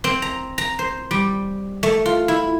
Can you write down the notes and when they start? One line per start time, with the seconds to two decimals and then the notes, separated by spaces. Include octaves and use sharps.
0.04 C4
0.22 A#5
0.58 A#5
0.79 C5
1.11 G3
1.83 A3
2.06 F4
2.28 E4